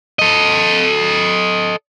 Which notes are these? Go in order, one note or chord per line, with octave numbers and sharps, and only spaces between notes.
A4 D#5